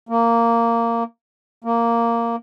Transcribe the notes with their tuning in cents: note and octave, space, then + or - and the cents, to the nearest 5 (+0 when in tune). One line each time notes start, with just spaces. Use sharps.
A#3 -10
A#3 -5